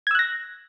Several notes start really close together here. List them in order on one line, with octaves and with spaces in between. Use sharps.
G#6 E6 F#6 A#6